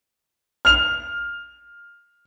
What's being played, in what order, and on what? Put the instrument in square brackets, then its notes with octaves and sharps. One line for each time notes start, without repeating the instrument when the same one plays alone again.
[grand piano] F6 F7